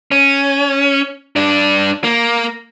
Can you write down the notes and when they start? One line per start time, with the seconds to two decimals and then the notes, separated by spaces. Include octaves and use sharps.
0.11 C#4
1.36 G2 D4
2.04 A#3